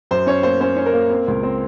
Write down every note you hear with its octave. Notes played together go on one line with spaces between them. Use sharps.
F#2 C5
C#4 C#5
A#3 C5
C#4 C5
C#4
A#4
A#3
C4
C#2
C4